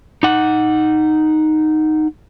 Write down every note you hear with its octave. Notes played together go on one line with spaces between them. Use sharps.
D#4 F#5